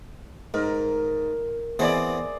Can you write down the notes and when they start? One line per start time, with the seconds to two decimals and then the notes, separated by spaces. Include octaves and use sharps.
0.54 G#2 A#4
1.79 E3 B3 C4 G#4 C5 D5